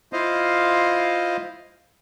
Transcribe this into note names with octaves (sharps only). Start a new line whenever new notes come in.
E4 F4 C5 D#5 F5